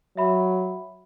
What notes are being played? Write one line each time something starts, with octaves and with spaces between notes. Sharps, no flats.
F#3 E5 B5